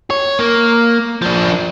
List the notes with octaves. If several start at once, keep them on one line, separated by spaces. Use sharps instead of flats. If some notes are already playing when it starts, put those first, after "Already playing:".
C#5
A#3
F3 D4